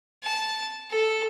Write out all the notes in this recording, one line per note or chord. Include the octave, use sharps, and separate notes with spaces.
A5
A4